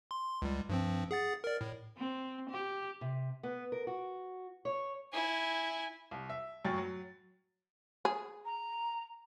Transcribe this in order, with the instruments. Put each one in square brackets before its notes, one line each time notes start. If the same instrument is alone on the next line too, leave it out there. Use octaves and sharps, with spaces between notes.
[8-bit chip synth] C6
C#2 G3
G2 F3 C4
G#4 F#5 A6
A#4 D5
A2
[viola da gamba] C4
G4
[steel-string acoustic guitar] C3
B3
A#4
F#4
C#5
[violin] E4 G#5
[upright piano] C2
E5
F#2 A2 F#3 G5 C#6 A6
F#3
[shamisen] G#4
[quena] A#5